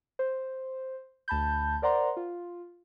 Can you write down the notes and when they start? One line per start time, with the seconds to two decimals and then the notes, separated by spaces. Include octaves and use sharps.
0.19 C5
1.28 D2 A5 B5 G6
1.82 A#4 C5 D5 F#5 A#5 C6
2.17 F4